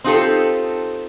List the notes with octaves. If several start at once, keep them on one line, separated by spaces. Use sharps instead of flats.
C4 D#4 F4 G4 A4